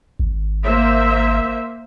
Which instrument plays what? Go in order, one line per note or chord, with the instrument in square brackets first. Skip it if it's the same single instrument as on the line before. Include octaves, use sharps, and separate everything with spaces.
[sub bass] G#1
[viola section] A#3 C5 E5